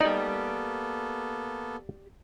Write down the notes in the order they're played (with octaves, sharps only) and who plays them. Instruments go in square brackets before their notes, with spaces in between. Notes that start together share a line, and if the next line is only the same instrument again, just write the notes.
[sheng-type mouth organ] A#3 B3 A4 [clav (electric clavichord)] D#4 [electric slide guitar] G4 D5